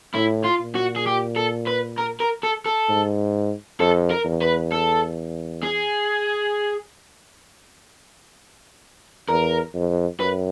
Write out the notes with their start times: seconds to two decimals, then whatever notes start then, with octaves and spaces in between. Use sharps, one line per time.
0.14 A2 E4
0.45 F4
0.60 A#2
0.75 F#4
0.96 G#4
1.06 G4
1.36 A4
1.67 B4
1.98 A#4
2.20 A#4
2.43 A4
2.66 A4
2.89 G#2
3.80 F2 A4
4.10 A#4
4.25 E2
4.41 B4
4.72 A4
5.63 G#4
9.29 E2 A#4
9.75 F2
10.20 F#2 B4